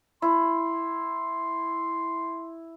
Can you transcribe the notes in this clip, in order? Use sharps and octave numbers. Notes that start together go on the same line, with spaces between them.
E4 C6